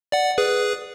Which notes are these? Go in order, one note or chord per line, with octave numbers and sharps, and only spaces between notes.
D5 F#5
G#4 B4